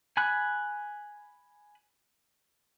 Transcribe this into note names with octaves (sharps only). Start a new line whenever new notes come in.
G#5 B5 F#6